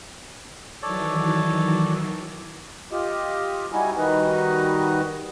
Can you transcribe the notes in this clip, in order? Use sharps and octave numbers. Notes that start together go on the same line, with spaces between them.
D#3 E3 F#3 A4 C#5 D5
F4 G4 D#5
G3 D#4 E4 F#4 G#5
D#3 G3 D#4 F#4 B4 D#5